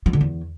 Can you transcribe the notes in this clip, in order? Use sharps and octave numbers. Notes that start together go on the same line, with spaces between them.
F3
D3
E2